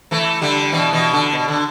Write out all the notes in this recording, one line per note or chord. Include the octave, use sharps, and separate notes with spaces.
E3 A3
D3 G3
B2 E3
B2 E3
D3
B2
D3